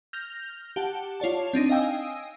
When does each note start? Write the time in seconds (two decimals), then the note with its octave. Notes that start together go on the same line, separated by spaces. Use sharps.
0.13 F6 G6 A#6 F7
0.76 G4 F#5 A5
1.20 F4 C#5 D5 A5
1.53 C4 D4 D#4
1.69 D#5 F5 G5 G#5 D#6 E6